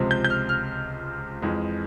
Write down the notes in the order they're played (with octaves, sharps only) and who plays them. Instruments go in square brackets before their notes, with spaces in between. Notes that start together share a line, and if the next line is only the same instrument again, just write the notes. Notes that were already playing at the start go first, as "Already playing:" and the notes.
Already playing: [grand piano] C#2 C3 F3 G#3
G6
G6
F6
F6
F2 E3 G#3